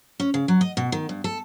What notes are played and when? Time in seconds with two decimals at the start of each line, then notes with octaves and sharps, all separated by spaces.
0.20 C#4
0.34 C#3
0.48 F#3
0.61 D#5
0.77 B2
0.92 D#3
1.09 G2
1.24 A4